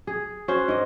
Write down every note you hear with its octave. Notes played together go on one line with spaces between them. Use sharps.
G#4
C#4 F#4 C5
G#2 D#5